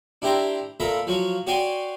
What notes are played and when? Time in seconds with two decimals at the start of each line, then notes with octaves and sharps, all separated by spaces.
0.22 D4 E4 G4 C5 A#5 D6
0.80 A#2 A4 E5 A#5 B5
1.07 F3 F#3 C#5
1.47 F#4 C#5 D5 G5 G#5 C6